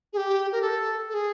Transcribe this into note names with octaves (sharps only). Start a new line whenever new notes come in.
G#4
G4
A#4
A4
A4
G#4